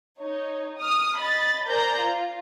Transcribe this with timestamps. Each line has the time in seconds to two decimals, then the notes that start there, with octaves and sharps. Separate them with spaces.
0.18 D#4 C#5
0.78 D#6 F6
1.17 D#5 B5 A6
1.67 A#4 C5 D5 G#5 A#5 G6
1.98 F4